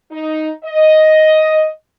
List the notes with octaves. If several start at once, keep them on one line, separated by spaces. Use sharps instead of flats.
D#4
D#5